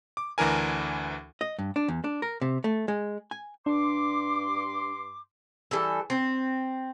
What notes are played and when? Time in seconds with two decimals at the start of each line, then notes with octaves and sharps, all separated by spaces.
0.17 D6
0.38 D2 E3 D4 A#4 G#5
1.41 D#5
1.59 G2
1.76 D4
1.88 E2
2.04 D4
2.22 A#4
2.41 C3
2.64 A3
2.88 G#3
3.31 G#5
3.66 G2 D4 C6 D6
5.71 E3 G3 A4
6.10 C4